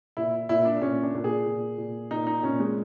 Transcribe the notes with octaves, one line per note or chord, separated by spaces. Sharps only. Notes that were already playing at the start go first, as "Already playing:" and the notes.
A#2 E4
A#2 E4
D4
A#2 C#4
D4
A#2
G#4
A#2
A#2
A#2 D#4
D#4
A#2 C#4
G#3